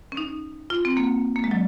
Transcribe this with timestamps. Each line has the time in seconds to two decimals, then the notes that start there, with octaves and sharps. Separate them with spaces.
0.12 C#4
0.17 D#4
0.70 F4
0.85 C4
0.97 A#3
1.36 A#3
1.44 G#3
1.51 F#3